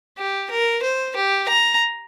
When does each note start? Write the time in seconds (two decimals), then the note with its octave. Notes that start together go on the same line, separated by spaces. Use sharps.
0.18 G4
0.50 A#4
0.83 C5
1.16 G4
1.48 A#5